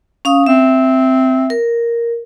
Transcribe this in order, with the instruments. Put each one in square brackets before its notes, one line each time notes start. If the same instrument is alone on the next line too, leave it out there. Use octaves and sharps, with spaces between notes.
[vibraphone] C#4 F5 D#6
[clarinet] C4 [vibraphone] E5
[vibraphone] A#4